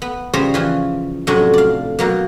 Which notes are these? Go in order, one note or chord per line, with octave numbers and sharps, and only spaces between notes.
B3
C#3 F3 G3 C5 C#5 A#5
E3 F3 C#4
F2 A2 C3 F#3 C#4 D4
D5 F5
B2 F#3 A#3